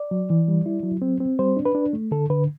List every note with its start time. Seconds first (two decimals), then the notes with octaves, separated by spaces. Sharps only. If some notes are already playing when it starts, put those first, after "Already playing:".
Already playing: D5
0.11 F#3
0.30 E3
0.48 G3
0.66 E4
0.83 F#3
1.02 C4
1.20 C4
1.39 G3 C5
1.57 D4
1.65 B4
1.75 D4
1.93 A3
2.11 D3 A4
2.30 D3 B4